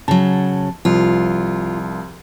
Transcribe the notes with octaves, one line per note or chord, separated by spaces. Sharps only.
C#3 F#3 A5
C2 F3 F4